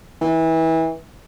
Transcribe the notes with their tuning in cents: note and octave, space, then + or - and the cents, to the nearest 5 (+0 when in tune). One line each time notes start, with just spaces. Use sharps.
E3 -25